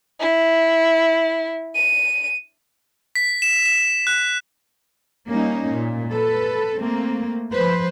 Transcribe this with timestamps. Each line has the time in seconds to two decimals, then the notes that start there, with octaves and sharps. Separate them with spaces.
0.20 E4
1.76 D#7
3.15 B6
3.42 E7
3.66 E7
4.07 F#6
5.29 G3 A#3 C#4 D#4
5.74 A#2
6.11 A4 B4
6.80 A3 A#3 C4
7.52 F3 B4 C5